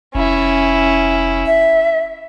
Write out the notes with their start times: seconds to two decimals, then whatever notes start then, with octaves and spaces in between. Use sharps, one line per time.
0.15 F1 C#4 E4
1.46 E5